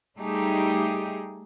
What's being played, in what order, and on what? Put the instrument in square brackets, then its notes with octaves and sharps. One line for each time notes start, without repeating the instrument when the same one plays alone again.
[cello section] G3 A3 D#4 G4 G#4